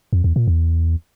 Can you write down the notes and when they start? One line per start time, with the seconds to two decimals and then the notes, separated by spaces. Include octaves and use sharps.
0.13 F2
0.24 E2
0.36 A#2
0.48 E2